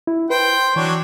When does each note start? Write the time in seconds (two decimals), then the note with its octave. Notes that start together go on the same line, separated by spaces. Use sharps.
0.07 E4
0.30 B4 C5 G5
0.76 E3 F#3 D4 C#5